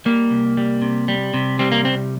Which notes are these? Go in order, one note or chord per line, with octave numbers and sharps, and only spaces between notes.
G3 A#3
C2
G3
C3
G3
C3
G3 C4
A#3
C2 C4